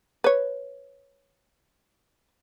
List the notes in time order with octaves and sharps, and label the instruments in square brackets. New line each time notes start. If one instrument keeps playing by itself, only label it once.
[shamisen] B4 C#5